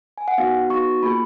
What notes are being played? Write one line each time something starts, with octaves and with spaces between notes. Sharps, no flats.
G#5
F#5
B3 D#4 F#4 F5
B3 D#4 F#4 C#6
A#3 F4 G#4 B5